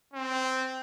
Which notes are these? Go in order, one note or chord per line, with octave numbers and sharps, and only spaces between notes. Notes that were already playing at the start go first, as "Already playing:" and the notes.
C4